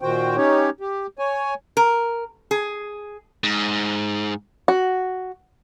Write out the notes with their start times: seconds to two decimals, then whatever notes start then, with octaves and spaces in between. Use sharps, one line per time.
0.02 A#2 D#3 F#4 C5 G5
0.36 C#4 D#4 G4 C#5
0.80 G4
1.19 C#5 G#5
1.77 A#4
2.51 G#4
3.43 G#2
4.68 F#4